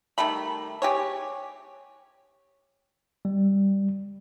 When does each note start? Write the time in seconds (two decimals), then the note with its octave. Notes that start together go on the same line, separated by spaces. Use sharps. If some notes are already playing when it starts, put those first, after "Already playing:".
0.18 D#3 G3 A3 B5
0.82 G4 G#4 C#5
3.25 G3